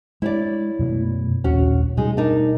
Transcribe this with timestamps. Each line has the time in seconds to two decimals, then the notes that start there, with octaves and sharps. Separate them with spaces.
0.22 G#3 D4 E4 C#5 D5
0.79 F#2 B2 A3
1.44 A1 D#2 A#2 C#4 F#4
1.97 B2 G3 G#3 D#4
2.17 D4 D#4 A#4